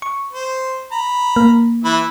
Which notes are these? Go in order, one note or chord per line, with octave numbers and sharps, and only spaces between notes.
C#6
C5
A#5 B5
A#3
E3 E5 B5